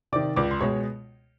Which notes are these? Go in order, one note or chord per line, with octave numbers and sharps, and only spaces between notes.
C3 D#3 D5 D6
C#2 D5 D6
C6
B2 G#3 C#5 C#6